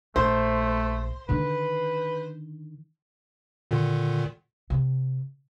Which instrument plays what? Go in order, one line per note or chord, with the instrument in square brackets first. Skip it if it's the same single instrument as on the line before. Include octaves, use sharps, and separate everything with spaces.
[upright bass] A#1 [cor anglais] A3 [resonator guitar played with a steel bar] C5
[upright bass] D3 D#3 [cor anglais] B4
[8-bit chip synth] A#2 D3 D#3
[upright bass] C3